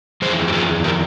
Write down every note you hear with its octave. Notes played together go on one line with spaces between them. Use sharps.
F2 E3 G#4 C5
G4
F4 G#4
G4 A#4